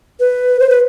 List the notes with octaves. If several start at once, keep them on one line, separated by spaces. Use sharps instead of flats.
B4
C5
B4